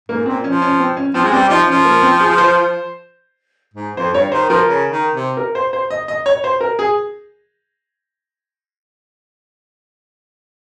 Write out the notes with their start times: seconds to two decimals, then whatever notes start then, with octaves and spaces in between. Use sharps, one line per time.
0.09 G#2 A#3
0.26 A#2 C4
0.44 F3 C#4
0.62 C#4
0.80 C4
0.97 C#4
1.14 F3 C4
1.24 G#3
1.33 G3 C4
1.50 F3 D#4
1.67 F3 C#4
1.85 A#3
2.02 C4
2.21 G#4
2.38 C5
3.74 G#2
3.97 F2 C5
4.14 G2 C#5
4.32 D#3 C5
4.49 F3 A#4
4.68 C#3
4.90 D#3
5.14 C3
5.37 A#4
5.55 C5
5.73 C5
5.90 D#5
6.08 D#5
6.26 C#5
6.44 C5
6.61 A#4
6.79 G#4